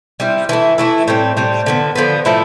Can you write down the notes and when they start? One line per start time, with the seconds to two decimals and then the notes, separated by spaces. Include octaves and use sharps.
0.20 G3 C4 E4
0.49 E3 A3 E4
0.78 E3 A3 E4
1.08 A2 G3 C4
1.37 A2 G3 C4
1.66 D3 F3 B3
1.95 D3 F3 B3
2.25 A2 F3 A3 E4